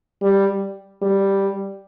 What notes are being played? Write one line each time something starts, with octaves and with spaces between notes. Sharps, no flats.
G3
G3